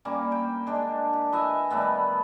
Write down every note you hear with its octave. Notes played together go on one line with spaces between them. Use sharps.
G3 A#3 C#4
G5
G#3 D4
G4
B4 D#5 E5 G#5
D#3 G3 A3 B3